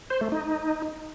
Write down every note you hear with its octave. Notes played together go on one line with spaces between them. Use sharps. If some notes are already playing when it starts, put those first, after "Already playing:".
C5
A3
D#4